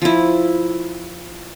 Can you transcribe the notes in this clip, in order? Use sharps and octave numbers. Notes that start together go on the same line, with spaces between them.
F3 E4